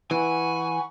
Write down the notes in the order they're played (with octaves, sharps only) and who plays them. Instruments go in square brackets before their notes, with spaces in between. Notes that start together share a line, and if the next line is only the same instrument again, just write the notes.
[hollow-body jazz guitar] E3 [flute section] F#5 B5 C#6 [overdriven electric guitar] G#5